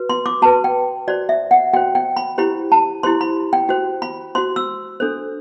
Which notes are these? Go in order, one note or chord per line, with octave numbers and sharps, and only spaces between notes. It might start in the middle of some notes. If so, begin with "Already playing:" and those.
Already playing: F#4 B4
C6
D6
F#4 B4 A5
G5
F#4 C5 D5
E5
F#5
F#4 C5 G5
G5
B5
E4 G4 C5 B5
A5
E4 G4 C5 C6
B5
G5
F#4 C5
B5
F#4 C5 C6
E6
D4 A4 C5